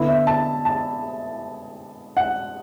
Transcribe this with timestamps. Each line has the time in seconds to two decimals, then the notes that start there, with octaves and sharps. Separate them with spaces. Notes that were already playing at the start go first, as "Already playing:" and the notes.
Already playing: D3 B3 E4
0.08 E5
0.27 A5
0.65 A5
2.17 F#5